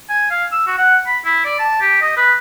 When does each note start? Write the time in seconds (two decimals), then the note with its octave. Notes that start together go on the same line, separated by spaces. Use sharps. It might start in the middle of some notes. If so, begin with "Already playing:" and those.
0.09 G#5
0.31 F5
0.52 E6
0.67 F#4
0.78 F#5
1.07 B5
1.25 E4
1.45 D5
1.59 A5
1.81 G4
2.02 D#5
2.17 B4